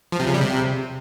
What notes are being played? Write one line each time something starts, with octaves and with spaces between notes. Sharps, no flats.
F3
C3
C#3
G3
C3